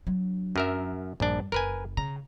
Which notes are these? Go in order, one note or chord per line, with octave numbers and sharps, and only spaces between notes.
F#3 D4
F#2 A#4 E5
A#1 G2 D4
F#1 A#4 B4 G#5
C#3 A#5